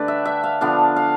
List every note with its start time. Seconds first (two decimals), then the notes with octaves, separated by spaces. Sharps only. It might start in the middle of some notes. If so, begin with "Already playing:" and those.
Already playing: D3 A3 D4 G4 B4 D5
0.08 E5
0.25 E5
0.43 F5
0.61 D3 F3 B3 D4 F5
0.96 F5